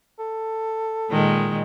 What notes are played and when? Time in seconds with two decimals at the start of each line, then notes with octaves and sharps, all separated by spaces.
0.19 A4
1.09 A#2 D#3 G#3